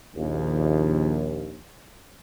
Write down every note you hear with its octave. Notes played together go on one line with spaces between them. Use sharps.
A#1 D#2